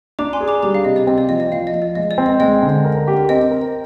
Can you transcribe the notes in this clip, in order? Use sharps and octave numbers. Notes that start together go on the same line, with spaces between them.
D4 A#5 D6
G#5 C6
G#4
A#5 D6
G3 A#5 D6
F5
C3 D#5
D5
C4 D#5
D5
F3 D#5
D#5
F3 F5
D#5
F3
D5
G#3 D#5
D5
C4
D#5
G#3 D#5 G5
D3
A#4
G4
C4 D#5 G5
A#4